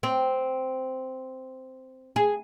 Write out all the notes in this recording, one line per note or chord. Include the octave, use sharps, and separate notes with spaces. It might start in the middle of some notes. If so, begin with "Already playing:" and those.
C4
G#4